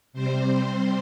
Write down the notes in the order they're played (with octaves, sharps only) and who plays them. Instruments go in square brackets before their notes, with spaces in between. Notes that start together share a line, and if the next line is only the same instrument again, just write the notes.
[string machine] C3 G3 C4 C5